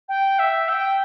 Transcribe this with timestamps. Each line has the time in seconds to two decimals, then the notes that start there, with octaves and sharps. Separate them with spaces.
0.08 G5
0.39 E5
0.68 G5